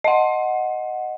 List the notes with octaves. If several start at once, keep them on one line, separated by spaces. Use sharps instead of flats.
D#5 F#5